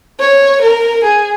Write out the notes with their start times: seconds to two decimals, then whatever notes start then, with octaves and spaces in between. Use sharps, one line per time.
0.20 C#5
0.62 A#4
1.04 G#4